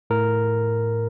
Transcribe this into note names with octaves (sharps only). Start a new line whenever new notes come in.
A2 A#4